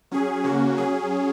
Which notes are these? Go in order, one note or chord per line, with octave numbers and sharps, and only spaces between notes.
F#3 C#4 G#4
C#3 A#3 C#4 F#4
F#3 C#4 G#4